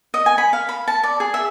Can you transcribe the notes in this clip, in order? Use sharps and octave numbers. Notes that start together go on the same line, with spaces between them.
D#5
G#5
B5
F5
B5
A5
D5
G#4
E5